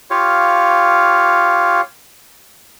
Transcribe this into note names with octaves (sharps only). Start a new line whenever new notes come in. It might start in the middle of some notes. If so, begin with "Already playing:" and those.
F4 G4 C#5 F5